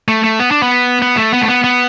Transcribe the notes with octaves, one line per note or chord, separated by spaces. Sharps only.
A3
A3
B3
D4
B3
B3
A3
B3
A3
B3
B3